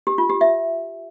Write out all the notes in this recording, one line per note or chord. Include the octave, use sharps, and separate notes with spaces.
G4
F4
G4
E5